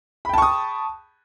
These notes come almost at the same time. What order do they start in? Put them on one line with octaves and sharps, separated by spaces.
B5 G5 A5 C#6 D#6